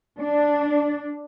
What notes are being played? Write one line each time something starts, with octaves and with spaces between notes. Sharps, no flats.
D4